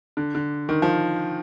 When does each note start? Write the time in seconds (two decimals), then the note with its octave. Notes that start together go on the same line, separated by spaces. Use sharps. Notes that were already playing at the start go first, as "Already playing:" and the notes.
0.17 D3
0.35 D3
0.69 D#3
0.82 F3